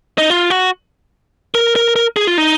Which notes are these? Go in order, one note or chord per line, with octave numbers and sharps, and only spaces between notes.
D#4
F4
F#4
A#4
A#4
A#4
G#4
F4
D#4